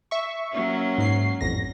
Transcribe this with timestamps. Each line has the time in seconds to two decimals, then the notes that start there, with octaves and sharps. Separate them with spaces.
0.11 E5 C#6
0.52 F#3 A#3 C#4
0.98 G#2 C7
1.41 A1 F2 A#6